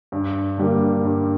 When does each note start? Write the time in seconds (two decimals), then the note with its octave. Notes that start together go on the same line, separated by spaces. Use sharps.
0.12 G2
0.58 D3 G3 A#3
1.04 G2